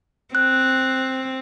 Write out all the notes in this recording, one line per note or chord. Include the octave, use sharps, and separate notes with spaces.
C4 F#6